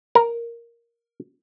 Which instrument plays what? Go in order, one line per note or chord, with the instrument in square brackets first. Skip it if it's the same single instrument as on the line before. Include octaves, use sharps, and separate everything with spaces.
[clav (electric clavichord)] A#4